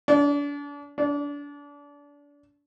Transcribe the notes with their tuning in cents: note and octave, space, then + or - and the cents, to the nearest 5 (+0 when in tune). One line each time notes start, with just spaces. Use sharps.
D4 -35
D4 -30